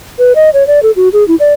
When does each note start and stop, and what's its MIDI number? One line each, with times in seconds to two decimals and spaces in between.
0.19 0.33 71
0.35 0.50 75
0.54 0.66 73
0.67 0.80 74
0.83 0.91 69
0.96 1.09 66
1.13 1.26 68
1.28 1.35 64
1.40 1.53 74